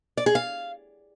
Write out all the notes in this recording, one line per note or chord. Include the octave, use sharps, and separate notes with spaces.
D5
G#4
F5